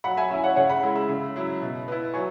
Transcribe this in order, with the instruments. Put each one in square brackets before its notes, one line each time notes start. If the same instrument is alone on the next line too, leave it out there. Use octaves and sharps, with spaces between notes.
[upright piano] F#3 [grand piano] F#5 B5
[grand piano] E5 G#5
[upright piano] C#4 E4 [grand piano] E5
[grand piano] C#5 F#5
[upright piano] C#3 [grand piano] C#5 F#5
[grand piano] F#5 B5
[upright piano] G#3 E4
[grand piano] B5 E6
[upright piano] C#3
F#3 E4
B2
B3 E4
[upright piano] F#3 [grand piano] G#5 C#6